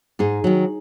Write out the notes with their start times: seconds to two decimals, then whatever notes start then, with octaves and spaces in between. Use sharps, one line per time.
0.19 G#2 D#4 G#4
0.44 D#3 F#3